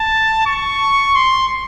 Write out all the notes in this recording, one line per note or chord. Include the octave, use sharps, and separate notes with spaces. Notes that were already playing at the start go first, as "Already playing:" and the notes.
Already playing: A5
C#6
C6